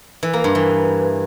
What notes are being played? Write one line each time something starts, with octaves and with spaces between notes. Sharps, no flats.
E3
A#3
G2
E3